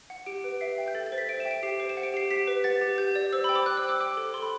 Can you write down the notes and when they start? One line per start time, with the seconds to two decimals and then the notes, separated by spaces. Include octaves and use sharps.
0.10 F#5
0.26 G4 D7
0.44 B4
0.61 E5 C7
0.78 G5
0.88 G6
0.95 A4 A6
1.06 A6
1.12 C5
1.18 B6
1.29 E5 D7
1.40 E7
1.45 G5
1.51 D7
1.63 G4 C7
1.80 C5
1.89 E7
1.97 F#5
2.03 D7
2.14 G4 C7
2.31 G4 B6
2.47 B4
2.64 F#5 A6
2.81 G4
2.98 G4 G6
3.15 D5
3.33 C5 E6
3.44 G5 B5
3.55 D6
3.66 C5 F#6
3.77 E6
3.83 G5
3.89 D6
4.00 G5 D6
4.17 A4
4.34 A4 C6
4.42 B5